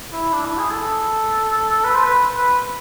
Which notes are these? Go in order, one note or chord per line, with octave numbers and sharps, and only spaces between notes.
E4
D4
E4
G#4
A4
B4
C5
B4
B4